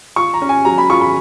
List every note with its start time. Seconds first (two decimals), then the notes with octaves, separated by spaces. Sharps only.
0.16 F4 C#6
0.34 A#5
0.42 C#4
0.49 G#5
0.65 F#3 A#5
0.78 B5
0.90 F4 C#6
1.01 B5